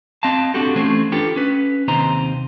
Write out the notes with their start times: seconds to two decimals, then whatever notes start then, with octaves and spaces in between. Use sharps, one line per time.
0.23 C4 D#5 F5 A5
0.54 C4 D4 F#4 G4 A4
0.76 E3 A3 C4 C#4 C5
1.12 D4 F4 G4 A4 B4
1.36 C#4 B4
1.88 D#2 C3 C4 D#4 C5 A#5